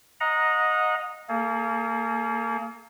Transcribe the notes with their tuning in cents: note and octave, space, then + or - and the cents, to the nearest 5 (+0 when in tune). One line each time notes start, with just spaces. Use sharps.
D#5 +0 F#5 -30 A#5 +0
A#3 -25 G#4 +40